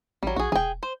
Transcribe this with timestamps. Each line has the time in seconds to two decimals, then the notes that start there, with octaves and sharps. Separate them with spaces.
0.23 A1 F#3 G3
0.36 A#1 F#4 G#4
0.52 E1 G#4 G5
0.83 C5